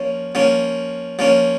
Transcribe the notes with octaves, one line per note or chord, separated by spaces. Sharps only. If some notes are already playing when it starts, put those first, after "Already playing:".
Already playing: F3 A#3 C#4
F3 A#3 C#4
F3 A#3 C#4